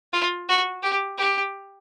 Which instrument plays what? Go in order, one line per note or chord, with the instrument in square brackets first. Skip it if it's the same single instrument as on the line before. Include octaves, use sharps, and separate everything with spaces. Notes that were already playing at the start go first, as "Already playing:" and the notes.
[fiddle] F4
F#4
G4
G4